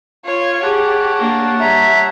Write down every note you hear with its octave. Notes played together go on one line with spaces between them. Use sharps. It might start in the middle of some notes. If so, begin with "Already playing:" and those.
F4 C#5
G4 G#4 C#5 F#5 A5
A#3 D4
G3 E5 A#5